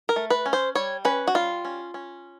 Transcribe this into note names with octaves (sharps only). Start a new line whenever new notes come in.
A#4
A3
B4
C#4
C5
G3 C#5
C#4 B4
F#4
G3 F4
C#4
C#4